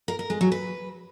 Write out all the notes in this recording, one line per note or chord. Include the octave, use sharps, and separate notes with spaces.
A#4
A#4
G#3
F#3
B4